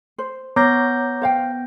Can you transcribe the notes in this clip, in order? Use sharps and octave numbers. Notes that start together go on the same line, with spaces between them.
C5
B3 C#5 A#5 D6 G6 A#6
C5 F5 G5